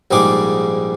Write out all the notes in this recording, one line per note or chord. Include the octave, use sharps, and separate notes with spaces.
A#1 G#2 G3 G#4 D6